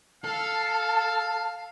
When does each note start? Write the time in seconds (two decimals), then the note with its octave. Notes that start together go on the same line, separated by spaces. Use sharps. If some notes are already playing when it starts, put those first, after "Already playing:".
0.24 A4 F5 A5